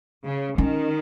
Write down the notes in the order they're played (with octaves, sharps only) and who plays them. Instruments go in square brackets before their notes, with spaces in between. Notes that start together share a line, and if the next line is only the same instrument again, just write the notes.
[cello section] C#3
[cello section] D#3 [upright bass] C#4